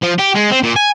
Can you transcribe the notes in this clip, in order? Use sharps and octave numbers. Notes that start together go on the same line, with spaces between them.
F3
G4
G#3
C4
A#2
G#5